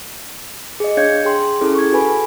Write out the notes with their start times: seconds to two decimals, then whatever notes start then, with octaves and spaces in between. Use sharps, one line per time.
0.80 G#4 D#5
0.97 D4 C#5 F5 G6 G#6 C#7
1.25 G#4 G5 C6
1.61 C#4 E4 G#4 A4
1.75 C#6 G#6
1.92 F#4 A4 B4 G#5 B5